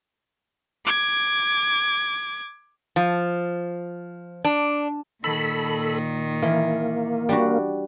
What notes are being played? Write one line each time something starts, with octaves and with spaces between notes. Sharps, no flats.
D6 G#6
F3
D4
A#2 D#3 A4 B5
E3 A#3
G3 D4 F#4